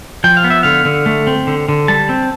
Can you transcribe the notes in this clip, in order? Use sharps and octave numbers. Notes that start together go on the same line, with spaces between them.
F3 G5
F5
B3
E5
D3 F5
D3
A3
C4
D3
D3
G3 A5
C4